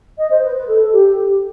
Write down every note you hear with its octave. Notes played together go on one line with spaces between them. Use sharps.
D#5
C5
B4
B4
A4
G4